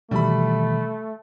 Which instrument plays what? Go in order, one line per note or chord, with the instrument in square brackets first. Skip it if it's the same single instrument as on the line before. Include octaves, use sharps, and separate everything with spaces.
[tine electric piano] B2 D#3 E3 [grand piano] G3 B5 [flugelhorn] A3